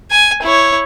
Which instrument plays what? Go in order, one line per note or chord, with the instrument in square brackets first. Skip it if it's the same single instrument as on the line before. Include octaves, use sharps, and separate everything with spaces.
[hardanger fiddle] G#5
E4 C#5